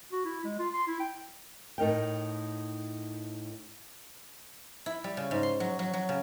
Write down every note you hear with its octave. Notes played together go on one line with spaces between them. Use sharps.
F#4
E4
G#3
F4
C6
E4
G5
A2 D#4 A#4 G5
E4
G3
C#3
G#2
C6
F#3
F#3
F#3
C#3